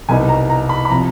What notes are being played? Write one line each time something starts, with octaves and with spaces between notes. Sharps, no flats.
C2 B2 G3 B3 D#4 G#5
A#5
A#5
B5
B5
C3 F3 A#5